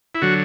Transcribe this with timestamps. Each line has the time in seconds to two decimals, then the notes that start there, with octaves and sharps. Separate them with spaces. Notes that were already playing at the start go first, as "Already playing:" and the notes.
0.15 E4
0.22 D3 F#3 F#4